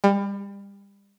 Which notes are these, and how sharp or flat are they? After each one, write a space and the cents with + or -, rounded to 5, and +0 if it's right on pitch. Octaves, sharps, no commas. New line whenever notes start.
G3 +30